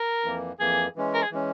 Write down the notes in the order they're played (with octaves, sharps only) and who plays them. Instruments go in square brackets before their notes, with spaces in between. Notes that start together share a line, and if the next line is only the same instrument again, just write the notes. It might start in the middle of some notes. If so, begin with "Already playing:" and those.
Already playing: [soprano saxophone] A#4
[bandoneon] F2 E3 A#3
[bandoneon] F2 E3 A#3 [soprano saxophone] G#4
[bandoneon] E3 G#3 C#4
[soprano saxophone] A#4
G#4
[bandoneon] E3 G#3 C#4